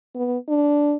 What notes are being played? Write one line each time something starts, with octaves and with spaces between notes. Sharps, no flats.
B3
D4